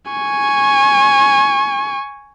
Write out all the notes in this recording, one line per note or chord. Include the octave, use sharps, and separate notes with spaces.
G#5 C#6